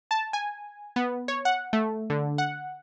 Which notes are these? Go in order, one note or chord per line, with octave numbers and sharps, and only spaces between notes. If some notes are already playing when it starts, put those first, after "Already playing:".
A5
G#5
B3
C#5
F#5
A3
D3
F#5